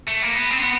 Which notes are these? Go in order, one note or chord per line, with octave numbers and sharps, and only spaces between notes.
A3
A#3
B3
C4
B3